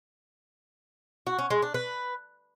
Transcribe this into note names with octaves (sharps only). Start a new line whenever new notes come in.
F#4
C#4
G#3
D4
B4